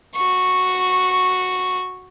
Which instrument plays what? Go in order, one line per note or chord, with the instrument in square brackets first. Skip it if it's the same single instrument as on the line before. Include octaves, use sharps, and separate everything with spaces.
[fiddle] F#4 C#6